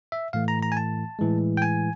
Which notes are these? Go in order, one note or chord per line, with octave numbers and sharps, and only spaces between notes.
E5
A2 E3 A3 F5
A#5
A#5
G#5
A5
A2 E3 G#3
G5
G#5